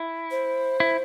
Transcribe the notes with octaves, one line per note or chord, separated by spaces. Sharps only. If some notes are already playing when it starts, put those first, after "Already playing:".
Already playing: E4
C5
E4